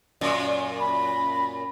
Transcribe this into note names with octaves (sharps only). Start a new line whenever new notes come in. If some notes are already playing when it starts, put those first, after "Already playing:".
F#2 A#2
B5